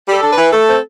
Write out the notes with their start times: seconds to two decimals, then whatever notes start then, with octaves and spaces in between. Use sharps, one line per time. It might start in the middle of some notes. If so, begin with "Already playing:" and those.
0.08 G3 A4
0.22 D4
0.32 E3 B4
0.52 A3 A4
0.68 C4